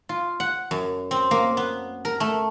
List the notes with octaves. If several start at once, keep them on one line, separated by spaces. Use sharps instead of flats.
F4
F#5
F#2
C4
A#3
B3
A#4
A3